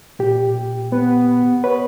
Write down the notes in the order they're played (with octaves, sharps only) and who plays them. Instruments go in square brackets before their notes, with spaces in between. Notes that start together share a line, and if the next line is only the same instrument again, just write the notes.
[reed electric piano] A#2 G4
[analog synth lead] B3
[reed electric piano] B4 C#5